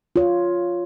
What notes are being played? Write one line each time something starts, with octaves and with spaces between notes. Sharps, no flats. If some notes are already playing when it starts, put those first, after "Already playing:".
F4 C#5